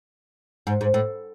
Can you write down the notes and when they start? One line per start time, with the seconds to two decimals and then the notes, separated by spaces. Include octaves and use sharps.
0.67 G#2
0.81 G#2
0.94 A2